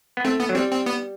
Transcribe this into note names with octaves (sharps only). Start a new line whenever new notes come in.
B3
A3 C4
B3
F#3
G3 C4
C4
B3